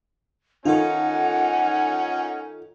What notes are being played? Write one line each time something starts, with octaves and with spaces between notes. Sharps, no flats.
D#3 C#4 D#4 F4 A4 F#5 G#5